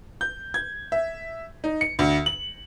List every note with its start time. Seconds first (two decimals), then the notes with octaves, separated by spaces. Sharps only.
0.21 G6
0.54 G#6
0.92 E5
1.64 D#4
1.81 C#7
1.99 D2
2.26 F#7